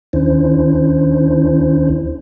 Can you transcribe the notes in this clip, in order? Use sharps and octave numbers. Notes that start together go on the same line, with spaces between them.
D#2 D#3 C#4 D4 E4 C5